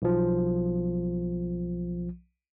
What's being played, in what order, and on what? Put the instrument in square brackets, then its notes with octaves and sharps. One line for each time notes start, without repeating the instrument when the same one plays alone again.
[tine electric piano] B1 F3